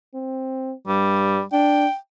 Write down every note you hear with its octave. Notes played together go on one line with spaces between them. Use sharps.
C4
G2 G3
D4 G5